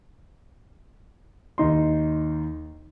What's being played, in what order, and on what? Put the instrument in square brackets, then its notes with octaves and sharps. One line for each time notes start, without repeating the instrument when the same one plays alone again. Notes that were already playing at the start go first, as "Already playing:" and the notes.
[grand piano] D#2 D#4 C6